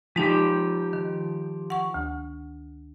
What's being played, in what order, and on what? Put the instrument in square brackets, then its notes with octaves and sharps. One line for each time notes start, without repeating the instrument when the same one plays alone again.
[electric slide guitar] F3 G4 [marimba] G#3 D#4
[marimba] D#3
F#5 C#6
D2